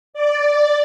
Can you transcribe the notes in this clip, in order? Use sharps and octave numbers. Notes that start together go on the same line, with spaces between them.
D5